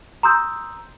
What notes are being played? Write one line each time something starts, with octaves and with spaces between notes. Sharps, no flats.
A#5 C6 D#6 E6 G6